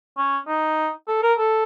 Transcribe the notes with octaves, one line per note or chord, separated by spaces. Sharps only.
C#4
D#4
A4
A#4
A4